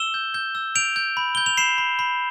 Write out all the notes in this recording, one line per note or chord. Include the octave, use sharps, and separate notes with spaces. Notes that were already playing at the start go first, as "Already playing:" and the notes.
Already playing: E6 E7 G7
G6
G6
E6
G6 D7 F7
G6
B5
G6 G7
F7
B5 C7 E7
B5
B5